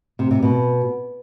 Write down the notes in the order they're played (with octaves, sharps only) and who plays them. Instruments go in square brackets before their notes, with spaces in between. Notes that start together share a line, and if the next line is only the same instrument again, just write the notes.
[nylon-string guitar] C3
C3
B2